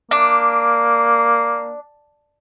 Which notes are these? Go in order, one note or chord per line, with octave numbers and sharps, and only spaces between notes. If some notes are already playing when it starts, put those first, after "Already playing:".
A#3 D4